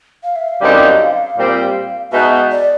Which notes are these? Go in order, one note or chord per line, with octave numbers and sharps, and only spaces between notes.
F5
E5
F5
F#2 D3 G3 C4 D#4
A#2 G3 C4
B2 G#3 B3 D#4 E5
D5